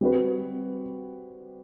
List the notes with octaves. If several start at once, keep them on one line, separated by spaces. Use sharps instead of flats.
G3 C4 F#4 B4